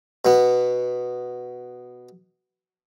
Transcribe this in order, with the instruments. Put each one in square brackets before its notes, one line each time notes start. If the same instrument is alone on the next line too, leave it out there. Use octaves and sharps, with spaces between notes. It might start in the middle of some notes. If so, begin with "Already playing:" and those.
[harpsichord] B2 B3